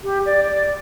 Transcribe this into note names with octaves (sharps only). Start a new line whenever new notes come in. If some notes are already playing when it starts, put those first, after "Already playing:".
G4
D5
D5